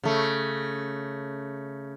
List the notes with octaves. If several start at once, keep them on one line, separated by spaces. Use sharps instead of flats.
C#3 A3